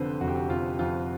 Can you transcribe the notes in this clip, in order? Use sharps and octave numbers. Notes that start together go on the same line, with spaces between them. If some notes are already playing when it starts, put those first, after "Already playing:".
Already playing: F1 F2 D3 B4 C5
F1 F#4
G4
F#4
F1 F4
F2 F4